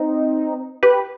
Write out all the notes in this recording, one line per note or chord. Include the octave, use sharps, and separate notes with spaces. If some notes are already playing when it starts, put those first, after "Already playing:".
Already playing: C4 D#4
G4 B4